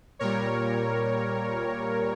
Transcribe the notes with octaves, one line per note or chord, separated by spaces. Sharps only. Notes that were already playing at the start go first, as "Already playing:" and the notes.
A#2 G3 A#4 C#5